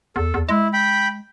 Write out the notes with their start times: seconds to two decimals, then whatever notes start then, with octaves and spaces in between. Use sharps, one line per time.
0.16 E2 A4
0.34 E2
0.49 G#3 E4
0.73 G5 B5